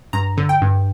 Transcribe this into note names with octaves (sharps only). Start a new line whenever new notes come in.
G2 A#5
D3
G5
G2